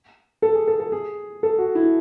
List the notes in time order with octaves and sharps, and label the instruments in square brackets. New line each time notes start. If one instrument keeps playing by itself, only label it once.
[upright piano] A4
G#4
A4
A4
G#4
A4
F#4
E4